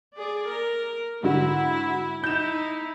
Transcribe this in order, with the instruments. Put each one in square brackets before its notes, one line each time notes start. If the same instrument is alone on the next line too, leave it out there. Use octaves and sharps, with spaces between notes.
[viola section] G#4 D5
A#4
[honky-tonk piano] G#2 D3 F#4 [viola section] E4
[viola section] D#4 E4 [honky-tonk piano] G6 E7